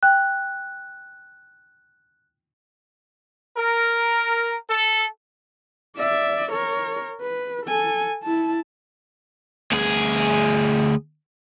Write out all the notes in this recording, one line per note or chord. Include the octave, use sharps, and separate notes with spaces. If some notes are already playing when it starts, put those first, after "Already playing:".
G5 F#6
A#4
A4
D5 E5
A#4 C#5
B4
A4 G#5
E4 A5
D2 G#4